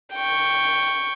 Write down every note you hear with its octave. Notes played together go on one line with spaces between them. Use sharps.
G5 C#6